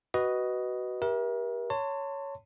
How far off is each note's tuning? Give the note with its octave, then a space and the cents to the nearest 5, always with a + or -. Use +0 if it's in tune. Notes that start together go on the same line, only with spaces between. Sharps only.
F#4 +20 B4 +0 D#5 +0
G4 +0 A#4 +40 E5 +0
C#5 +5 A5 +30 C6 -10